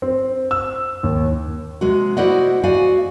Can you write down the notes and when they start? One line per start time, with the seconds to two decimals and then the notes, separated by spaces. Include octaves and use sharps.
0.02 C4
0.51 E6
1.03 D#2
1.81 C3 G#3 F#4
2.17 E4 F#4 C5 D5 D#5 F#5
2.63 F#4 D5 F5 G#5